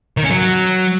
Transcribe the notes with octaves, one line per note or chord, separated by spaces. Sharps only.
D#3
C#4
F#3